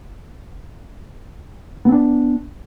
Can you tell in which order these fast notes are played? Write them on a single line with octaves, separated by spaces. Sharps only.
B3 C4 D4